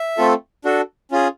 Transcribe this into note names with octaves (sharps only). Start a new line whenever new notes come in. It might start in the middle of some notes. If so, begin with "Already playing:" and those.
Already playing: E5
A3 C4 F4 A4
D4 F#4 A4
C#4 F4 G#4